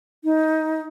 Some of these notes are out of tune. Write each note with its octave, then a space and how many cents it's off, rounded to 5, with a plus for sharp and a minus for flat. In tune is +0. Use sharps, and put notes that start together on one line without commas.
D#4 +20